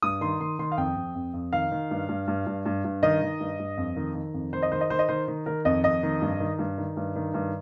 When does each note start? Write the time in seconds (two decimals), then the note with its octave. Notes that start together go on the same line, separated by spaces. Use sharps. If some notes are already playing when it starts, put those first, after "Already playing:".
0.02 G2 D#6
0.21 D#3 C6
0.40 D#3 C6
0.59 D#3 C6
0.72 F5
0.77 F2 G5
0.96 F2
1.15 F2
1.34 F2
1.53 D#3 F5
1.72 D#3
1.91 G2
2.09 G2
2.28 G2
2.46 G2
2.66 G2
2.84 G2
3.03 D#3 D#5
3.22 D#3
3.40 G2
3.59 G2
3.77 F2
3.96 D#3
4.15 D#3
4.34 F2
4.53 D#3 C5
4.62 D#5
4.72 D#3 C5
4.81 D#5
4.90 D#3 C5
4.99 D#5
5.09 D#3 C5
5.28 D#3
5.46 D#3 A#4
5.65 F2 D#5
5.84 F2 D#5
6.03 D#3
6.21 G2
6.40 D#3
6.59 G2
6.78 D#3
6.97 G2
7.16 D#3
7.34 G2